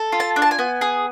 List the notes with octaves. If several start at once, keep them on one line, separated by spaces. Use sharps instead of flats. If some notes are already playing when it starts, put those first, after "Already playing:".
Already playing: A4
F4
A5
D4
A5
G#5
B3
G#4